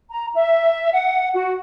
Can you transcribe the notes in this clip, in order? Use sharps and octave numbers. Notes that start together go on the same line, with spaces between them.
A#5
E5
F#5
F#4